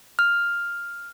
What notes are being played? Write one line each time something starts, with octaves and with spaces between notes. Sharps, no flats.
F6